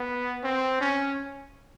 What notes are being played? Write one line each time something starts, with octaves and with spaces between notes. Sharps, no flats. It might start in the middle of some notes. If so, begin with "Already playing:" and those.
Already playing: B3
C4
C#4